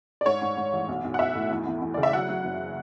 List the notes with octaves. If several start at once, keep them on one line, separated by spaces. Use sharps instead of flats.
D5
G#2 C#5
G#2
G#2
A1
B1
B1
F#5
B1 E5
A2
E2
E2
E2
C#3 D5
E5
F#3 F#5
F#3
F#1